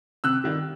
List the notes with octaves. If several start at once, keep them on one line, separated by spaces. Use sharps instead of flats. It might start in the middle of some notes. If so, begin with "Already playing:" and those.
C3 E6 F#6
D#3 G3